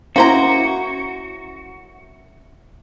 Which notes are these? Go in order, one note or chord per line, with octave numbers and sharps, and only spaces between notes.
A#3 C#4 E4 F#4 C5 A#5